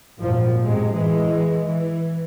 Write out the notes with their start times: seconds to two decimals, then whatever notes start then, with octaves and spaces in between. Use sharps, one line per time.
0.18 G#1 F#2 A#2 F3
0.60 F#2 A2 C3 G#3
0.94 E3 G#3
1.64 E3